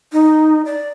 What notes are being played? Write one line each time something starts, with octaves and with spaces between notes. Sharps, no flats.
D#4
D5